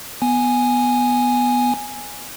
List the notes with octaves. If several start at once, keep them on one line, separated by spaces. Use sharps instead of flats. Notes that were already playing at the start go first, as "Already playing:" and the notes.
B3 G#5